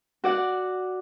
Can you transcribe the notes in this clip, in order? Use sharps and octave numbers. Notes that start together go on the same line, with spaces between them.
F#4 D5 F#5